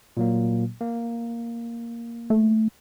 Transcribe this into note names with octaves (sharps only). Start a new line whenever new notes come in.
A#2 F#3 A#3
A#3
A3